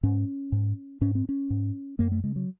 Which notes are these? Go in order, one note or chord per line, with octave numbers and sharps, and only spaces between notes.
G#2 C#4
G#2
G#2 C#4
C4
C#4
G#2
F#2 A#3
A3
C#3 G#3
F#3